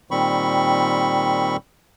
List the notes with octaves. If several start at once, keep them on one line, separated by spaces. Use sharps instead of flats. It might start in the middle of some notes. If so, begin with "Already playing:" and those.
A#2 D#3 G3 C4 B5 C#6